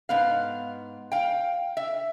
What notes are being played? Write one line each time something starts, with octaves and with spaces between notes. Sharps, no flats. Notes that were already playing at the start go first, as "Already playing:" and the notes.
G#2 B3 F5
F5 G5
E5